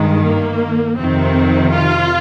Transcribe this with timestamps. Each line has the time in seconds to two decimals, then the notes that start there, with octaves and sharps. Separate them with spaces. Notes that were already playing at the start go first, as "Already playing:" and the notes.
Already playing: G2 D#3 G#3
0.24 A#3
0.98 F2 C3 D#3 C4
1.72 F4